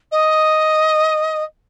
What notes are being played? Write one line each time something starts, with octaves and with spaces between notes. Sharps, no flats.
D#5